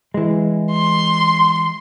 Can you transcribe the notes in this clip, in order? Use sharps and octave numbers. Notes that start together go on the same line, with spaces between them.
E3 G#3
C6